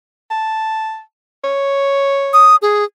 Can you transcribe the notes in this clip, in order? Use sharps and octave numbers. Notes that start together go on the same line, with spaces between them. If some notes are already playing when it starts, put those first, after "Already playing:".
A5
C#5
D#6
G#4